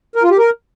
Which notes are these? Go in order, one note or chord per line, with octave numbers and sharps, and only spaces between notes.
A#4
F4
G4
A#4